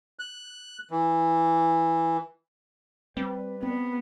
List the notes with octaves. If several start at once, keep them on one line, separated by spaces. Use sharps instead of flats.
F#6
E3
G3 C4 B4
B3 C4